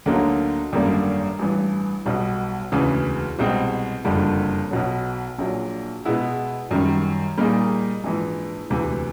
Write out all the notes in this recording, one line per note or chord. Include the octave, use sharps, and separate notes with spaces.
D2 D3 F#3 A#3 D#4
G#1 F#2 D3 G3 A#3
A1 G2 E3
B1 B2 G3
E1 D2 C#3 E3
C2 B2 G#3 C4
F#1 F2 D3 G3
B1 B2 F#3
A#1 A#2 F#3
B2 G#3 B3 E4 G#4
F#2 D#3 G3
A#2 G3 A#3 D#4 G#4
A#1 G#2 E3
E1 D2 C3 E3